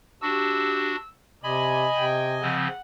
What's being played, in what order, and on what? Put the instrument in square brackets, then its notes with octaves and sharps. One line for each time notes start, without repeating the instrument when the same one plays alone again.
[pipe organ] D4 F#4 [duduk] G4 [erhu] E6
[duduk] C3 [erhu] D5 [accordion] D#5 G#5 [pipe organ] B5
[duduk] C3 [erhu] G5
[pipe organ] C#3 F3 C4 [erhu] F#5